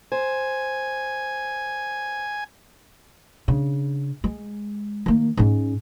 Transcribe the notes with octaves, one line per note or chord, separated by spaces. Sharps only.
C5 G#5
C#3 D4
G#3
D#3 A#3
G#2 C#4